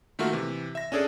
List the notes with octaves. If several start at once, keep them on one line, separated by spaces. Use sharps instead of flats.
D#3 A3 A#3 F4 F#4 E5
C3 E3
E5 A#6
C#4 D4 G#4 A4 D5